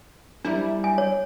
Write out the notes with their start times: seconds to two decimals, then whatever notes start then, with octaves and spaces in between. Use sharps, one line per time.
0.45 G3 D4 E4 A#4
0.84 G#5
0.98 C#5